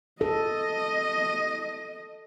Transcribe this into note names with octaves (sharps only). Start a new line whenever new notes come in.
A4 D#5